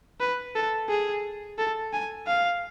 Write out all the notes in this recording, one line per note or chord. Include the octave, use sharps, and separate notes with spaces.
B4
A4
G#4
A4
G#5
F5